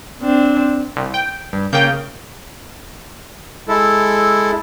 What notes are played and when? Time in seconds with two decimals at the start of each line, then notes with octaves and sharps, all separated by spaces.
0.21 C4 D4
0.96 C2
1.14 G5
1.53 G2
1.73 C#3 A#3 C#4 G5 G6
3.68 G#3 E4 A4